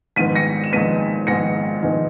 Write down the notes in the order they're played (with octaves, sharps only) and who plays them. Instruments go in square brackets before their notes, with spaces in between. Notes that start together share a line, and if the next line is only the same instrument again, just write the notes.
[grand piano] A#1 G#2 D#3 G#3 B3 B6 D#7
A#6 C#7
E7
A#1 G#2 D#3 G#3 B3 B6 D#7
A#1 G#2 D#3 G#3 B3 A#6 C#7
A#1 G#2 D#3 G#3 B3